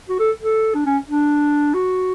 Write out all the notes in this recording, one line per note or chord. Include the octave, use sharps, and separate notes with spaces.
F#4
A4
A4
D4
C#4
D4
F#4